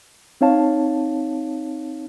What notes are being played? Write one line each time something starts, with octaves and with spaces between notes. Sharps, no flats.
C4 D#4 C#5 F5 A5